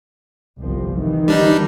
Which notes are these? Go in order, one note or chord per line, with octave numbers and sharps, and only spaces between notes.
G1 C2 F3
D#3 E3
G3 D4 D#4